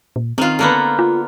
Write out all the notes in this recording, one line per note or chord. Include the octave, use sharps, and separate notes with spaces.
A#2
D#3 C4 F4
D3 A#3 B3
F4